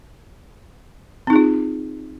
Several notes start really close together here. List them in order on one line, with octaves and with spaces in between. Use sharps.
C4 D#4 G#4 F4